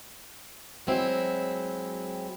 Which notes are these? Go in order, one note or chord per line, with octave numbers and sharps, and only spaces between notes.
F#3 G#3 C4 E4